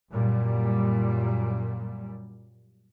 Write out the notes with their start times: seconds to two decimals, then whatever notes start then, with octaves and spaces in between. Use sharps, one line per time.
0.12 F#2 A#2 G3